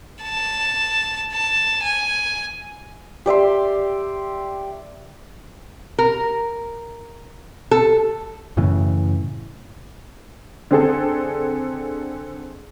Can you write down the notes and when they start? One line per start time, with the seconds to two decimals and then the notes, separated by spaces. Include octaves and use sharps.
0.23 A5
1.33 A5
1.83 G#5
3.26 G4 D5 E5 C6
5.99 A#4
7.71 A4
8.57 F#2 A2 C#3 E3
10.71 D3 C4 G#4 A4